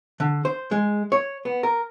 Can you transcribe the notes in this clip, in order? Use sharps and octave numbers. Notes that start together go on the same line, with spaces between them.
D3
C5
G#3
C#5
B3
A#4